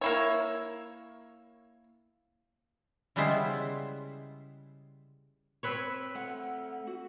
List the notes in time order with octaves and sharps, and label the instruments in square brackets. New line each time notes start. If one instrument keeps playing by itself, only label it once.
[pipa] A#3 E4 C#5
[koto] C#3 G3 G#3 B3 E4 C5
[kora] C4 B4 C#5
[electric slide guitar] A3 F#5
F#4